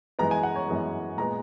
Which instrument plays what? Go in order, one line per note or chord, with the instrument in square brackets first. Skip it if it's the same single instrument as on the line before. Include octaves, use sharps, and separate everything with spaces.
[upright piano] F#2 E3 G#3 B3 A#5
G#5
F#5
C#5
F#2 E3 G#3 B3
A#2 G#3 B3 A#5